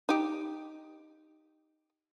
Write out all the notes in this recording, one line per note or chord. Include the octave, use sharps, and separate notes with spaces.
D#4 G4